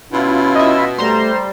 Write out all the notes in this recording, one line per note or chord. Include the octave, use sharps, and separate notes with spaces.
B2 C#4 E4 F4
D#5 E5
G3 A3 C5 A#5 C6